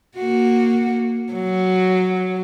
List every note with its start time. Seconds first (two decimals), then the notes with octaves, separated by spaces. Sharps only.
0.17 A#3 F#4
1.33 F#3